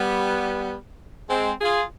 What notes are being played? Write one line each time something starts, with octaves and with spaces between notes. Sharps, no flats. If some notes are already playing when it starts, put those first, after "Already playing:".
Already playing: G3 B3
G#3 C4
F4 G#4